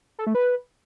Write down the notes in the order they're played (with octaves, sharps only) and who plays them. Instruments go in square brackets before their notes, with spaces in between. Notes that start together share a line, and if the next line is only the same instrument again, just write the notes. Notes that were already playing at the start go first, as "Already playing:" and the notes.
[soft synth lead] A4
A3
B4